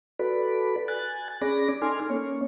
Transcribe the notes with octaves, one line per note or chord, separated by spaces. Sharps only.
F#4 A4 B4 D5 B5
G#5 F#6 A6
C#4 G#4 D5 B5 D6 A#6
D#4 A4 G#5 C6 D6 F6
A#3 C#4 C#5